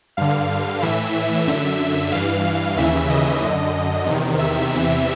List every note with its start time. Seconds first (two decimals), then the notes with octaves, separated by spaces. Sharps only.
0.17 G2 D3 F5
0.82 A2 E3 E5
1.47 F#2 D3
2.12 G2 E3 F5
2.76 D#2 C#3 E3 E5
3.10 D#5
3.42 F#2 D3
4.06 E2 C3 D#3
4.39 E5
4.72 E2 C3 E3